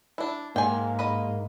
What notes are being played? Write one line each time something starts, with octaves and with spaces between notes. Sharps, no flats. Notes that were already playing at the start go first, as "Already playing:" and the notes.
D4 E4
G#2 A#3 G5 G#5
B4 D#5